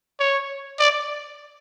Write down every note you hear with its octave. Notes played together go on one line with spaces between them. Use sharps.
C#5
D5